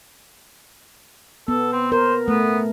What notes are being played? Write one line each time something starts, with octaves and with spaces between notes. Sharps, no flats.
B3 A4
C4
A#4 C5
A3 B3